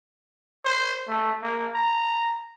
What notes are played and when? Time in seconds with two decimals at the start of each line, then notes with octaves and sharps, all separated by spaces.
0.65 C5
1.08 A3
1.42 A#3
1.74 A#5